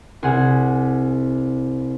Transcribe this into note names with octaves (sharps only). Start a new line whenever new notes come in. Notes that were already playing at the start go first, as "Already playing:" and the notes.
C2 G#4 F#5